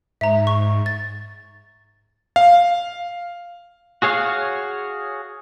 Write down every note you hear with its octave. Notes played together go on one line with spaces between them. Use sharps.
G#2 E5 A#5
C#6
A6
F5
F#4 G#4 C#5 F5